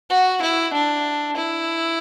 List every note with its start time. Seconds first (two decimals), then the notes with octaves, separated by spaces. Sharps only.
0.10 F#4
0.42 E4
0.73 D4
1.36 E4